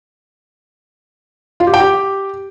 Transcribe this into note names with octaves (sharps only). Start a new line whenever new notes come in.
F4
G4
G5
G4